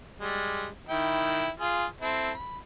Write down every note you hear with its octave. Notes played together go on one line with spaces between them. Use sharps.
G3 G#3
D#3 E4 G5
F4 G#4
C4 E4 A4
B5